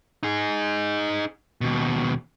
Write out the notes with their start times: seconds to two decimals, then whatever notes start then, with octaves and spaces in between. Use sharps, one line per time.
0.23 D#4 G#4
1.61 D#2 B2